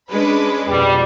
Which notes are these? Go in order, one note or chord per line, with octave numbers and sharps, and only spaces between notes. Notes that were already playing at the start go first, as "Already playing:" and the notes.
G#3 C#4 D4 B4
F2 B2 G3